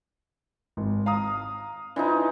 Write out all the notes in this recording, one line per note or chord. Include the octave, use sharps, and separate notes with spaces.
G#1
F5 A#5 D#6
E3 F3 D4 D#4